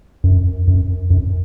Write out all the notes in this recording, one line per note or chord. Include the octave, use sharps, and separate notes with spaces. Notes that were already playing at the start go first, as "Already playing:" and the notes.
F#2
F#2
F#2